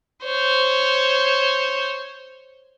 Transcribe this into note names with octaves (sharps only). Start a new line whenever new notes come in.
C5 C#5